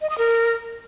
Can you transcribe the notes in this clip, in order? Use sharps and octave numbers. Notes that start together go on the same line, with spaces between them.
D#5
D#6
A#4